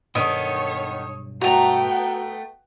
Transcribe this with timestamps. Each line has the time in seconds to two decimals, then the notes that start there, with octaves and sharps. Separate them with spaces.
0.15 B1 G2 D#3 B3 A4 C#5 D#6
1.41 A3 B3 F#4 G5 A#5